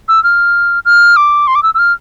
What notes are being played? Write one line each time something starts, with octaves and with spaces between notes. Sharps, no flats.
E6
F6
F6
D6
C6
D6
E6
E6
F6